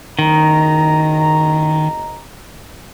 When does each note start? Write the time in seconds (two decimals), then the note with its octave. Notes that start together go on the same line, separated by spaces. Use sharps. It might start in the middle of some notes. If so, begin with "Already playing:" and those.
0.19 F#1 D#3 D#5 A#5